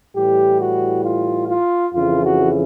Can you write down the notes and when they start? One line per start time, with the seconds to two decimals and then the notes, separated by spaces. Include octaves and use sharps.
0.15 A2 E3 G3 G4
0.59 F#4
1.03 F4
1.48 F4
1.93 F2 C#3 E3 F4
2.23 F#4